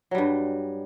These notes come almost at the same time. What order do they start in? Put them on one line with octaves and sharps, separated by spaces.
F#3 G3 G2